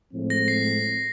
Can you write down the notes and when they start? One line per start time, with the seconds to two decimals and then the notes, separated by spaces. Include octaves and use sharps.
0.13 A2 F3 G#3 C4
0.30 A#6
0.48 C7